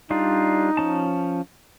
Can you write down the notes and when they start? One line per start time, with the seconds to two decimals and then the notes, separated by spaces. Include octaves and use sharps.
0.10 G3 D4 D#4 F4
0.77 F3 C#4 A5